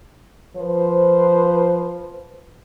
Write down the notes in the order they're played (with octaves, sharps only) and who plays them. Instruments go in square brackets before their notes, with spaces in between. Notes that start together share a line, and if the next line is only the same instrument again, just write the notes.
[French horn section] F3 B4 C5